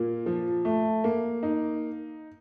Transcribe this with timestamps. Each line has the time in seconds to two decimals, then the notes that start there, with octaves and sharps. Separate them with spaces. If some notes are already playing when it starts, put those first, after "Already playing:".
Already playing: A#2 A#3
0.26 F3
0.65 A3
1.04 A#3
1.43 D#4